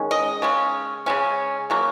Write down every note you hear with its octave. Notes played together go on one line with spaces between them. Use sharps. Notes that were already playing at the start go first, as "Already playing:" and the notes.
Already playing: D#3 G#3 C#4
D#5
C#3 G#3 C#4
C#3 G#3 C#4
C#3 F#3 A#3